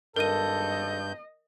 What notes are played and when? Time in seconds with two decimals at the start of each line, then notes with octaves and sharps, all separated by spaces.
0.16 G#1 G2 A4 A#4 D#5 G6 D#7